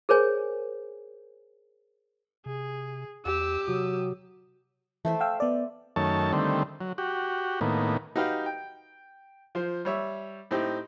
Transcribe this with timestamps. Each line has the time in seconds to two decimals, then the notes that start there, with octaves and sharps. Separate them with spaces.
0.09 G#4 A#4 C5 C#5 G#5
2.46 C3 G#4
3.26 E2 G4 E6
3.68 C3 F#3 D#6 E6
5.05 E3 A3 C5 E5
5.21 F5 G5 E6
5.40 B3 D5
5.96 F#2 D#3 A3 C#5 A5
6.33 D3 D#3 G3 A3 C4
6.81 F#3
6.98 F#4 G4
7.61 A2 D#3 A#3 B3
8.16 D#4 F#4 G4 B4 F5
8.46 G5
9.55 F3 C5
9.85 G3 C#5 E5
10.51 A2 C4 D#4 G4